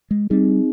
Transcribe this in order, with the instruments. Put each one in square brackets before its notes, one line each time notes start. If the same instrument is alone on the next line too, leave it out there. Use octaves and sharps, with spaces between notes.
[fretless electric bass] G#3
[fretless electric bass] G3 [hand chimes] C4 D#4 G#4